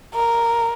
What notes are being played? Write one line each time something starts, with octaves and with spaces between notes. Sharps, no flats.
A#4